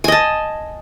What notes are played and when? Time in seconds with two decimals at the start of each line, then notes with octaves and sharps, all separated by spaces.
0.04 G#5
0.08 D#5
0.12 A5